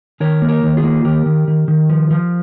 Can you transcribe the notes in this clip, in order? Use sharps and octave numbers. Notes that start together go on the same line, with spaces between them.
D#3 A#4 C#5
A#3
A#4 C#5
D#3
F4 G#4
A#3
D#3 G4 A#4
D#3
D#3
D#3
F3
F3